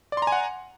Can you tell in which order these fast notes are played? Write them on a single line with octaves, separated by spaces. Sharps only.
D5 C6 A#5 G#5 F#5